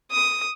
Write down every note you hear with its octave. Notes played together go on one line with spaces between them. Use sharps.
D#6